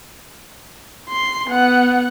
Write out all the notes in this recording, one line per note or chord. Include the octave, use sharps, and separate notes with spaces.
C6
B3 F#5